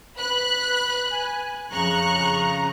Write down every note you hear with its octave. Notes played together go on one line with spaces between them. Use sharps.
B4 B5 F#6
G#5
F2 C#3 A#5 C#6 F#6